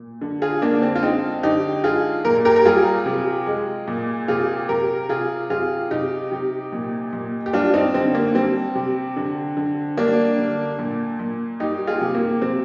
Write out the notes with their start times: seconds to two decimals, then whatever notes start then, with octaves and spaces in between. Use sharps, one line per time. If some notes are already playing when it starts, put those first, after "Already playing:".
Already playing: A#2
0.21 D3
0.42 F4 G#4
0.62 D3 A#3 D4
0.82 C4
0.95 F4
1.03 G#3 C4 D#4
1.43 D3 D#4 G4
1.84 G#3 F4 G#4
2.25 A#2 A#4
2.45 G4 A#4
2.56 A#4
2.65 G3 F4 G#4
3.06 C3
3.47 G#3
3.88 A#2
4.28 C3 F4 G#4
4.69 C3 G4 A#4
5.09 C3 F4 G#4
5.50 C3 F4 G#4
5.91 C3 D#4 G4
6.32 C3
6.72 A#2
7.13 A#2
7.46 G4
7.53 G3 D4 F4
7.74 C4 D#4
7.94 D3 C4
8.15 A#3
8.35 G3 C4
8.75 C3
9.16 D3
9.57 D3
9.97 G3 A#3 D4
10.38 D3
10.79 A#2
11.19 A#2
11.60 G3 D#4 G4
11.87 F4 G#4
12.01 C3
12.15 A#3
12.42 C3 C4